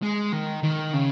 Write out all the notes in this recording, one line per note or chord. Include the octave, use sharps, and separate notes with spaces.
G#3
D#3
D#3
C#3